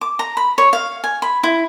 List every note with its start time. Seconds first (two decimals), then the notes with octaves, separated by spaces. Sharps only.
0.01 D6
0.19 A#5
0.37 B5
0.58 C#5
0.73 F5
1.04 G#5
1.22 B5
1.43 E4